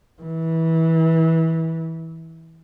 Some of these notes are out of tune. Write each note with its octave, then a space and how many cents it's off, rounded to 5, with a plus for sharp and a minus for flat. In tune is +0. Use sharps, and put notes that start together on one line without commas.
E3 -20